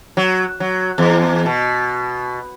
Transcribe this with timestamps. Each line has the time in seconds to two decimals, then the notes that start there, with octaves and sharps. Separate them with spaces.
0.17 F#3
0.60 F#3
0.98 E2
1.46 B2